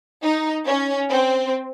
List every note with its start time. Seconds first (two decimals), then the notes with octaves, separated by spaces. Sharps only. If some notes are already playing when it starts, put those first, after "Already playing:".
0.22 D#4
0.65 C#4
1.09 C4